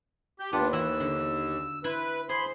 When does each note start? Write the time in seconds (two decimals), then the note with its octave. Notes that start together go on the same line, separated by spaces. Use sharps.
0.40 G4 G6
0.53 D#2 B3 D4 F4 G4
0.73 E3 E4 F#4 E6
1.00 D3
1.84 E4 B4 C5
2.29 G#4 C5 B5 C6